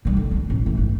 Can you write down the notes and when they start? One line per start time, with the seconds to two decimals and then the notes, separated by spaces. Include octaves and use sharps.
0.05 D#3 G3
0.17 D3
0.31 D4
0.50 A1
0.66 E3 A3
0.77 G1